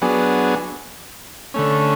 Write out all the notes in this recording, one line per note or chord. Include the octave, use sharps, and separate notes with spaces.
F#3 B3 D4 G#4
D3 A3 C#4